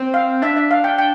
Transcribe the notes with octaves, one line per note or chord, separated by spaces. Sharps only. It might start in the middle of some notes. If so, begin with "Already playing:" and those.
Already playing: C4
F5
D4 E5
E5
F5
G5
G5